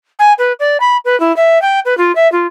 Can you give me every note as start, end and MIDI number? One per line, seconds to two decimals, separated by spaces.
0.19 0.33 80
0.38 0.52 71
0.60 0.77 74
0.80 0.97 83
1.05 1.18 71
1.20 1.34 64
1.36 1.61 76
1.62 1.80 79
1.85 1.97 71
1.97 2.14 65
2.15 2.30 76
2.32 2.47 65